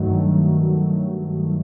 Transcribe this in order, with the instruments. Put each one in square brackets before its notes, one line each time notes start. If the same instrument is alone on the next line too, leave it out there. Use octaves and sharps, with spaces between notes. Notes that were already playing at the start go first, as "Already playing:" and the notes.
Already playing: [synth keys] G2 D#3 F#3 A3